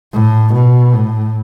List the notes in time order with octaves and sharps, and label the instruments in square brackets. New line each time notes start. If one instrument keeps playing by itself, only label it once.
[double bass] A2
B2
A2